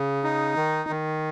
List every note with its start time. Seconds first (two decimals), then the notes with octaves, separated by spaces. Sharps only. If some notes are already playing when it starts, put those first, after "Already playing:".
Already playing: C#3
0.24 D#4
0.56 D#3
0.89 D#3